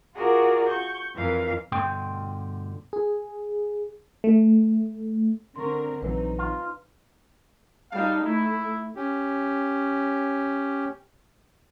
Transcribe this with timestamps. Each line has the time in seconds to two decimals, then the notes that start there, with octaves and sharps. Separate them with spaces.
0.15 F4 F#4 G#4 A#4 D5
0.68 C#6 G6
1.14 F2 E3 A#4 F5
1.72 G2 B2 D3 G5 C6
2.93 G#4
4.24 A3
5.56 D3 C4 A#4 C6 C#6
6.02 A#1 E3 F#3 C4 D#4 B4
6.38 F4
7.92 G3 D#4 F5 A5
8.24 A3 E4
8.95 C#4 G4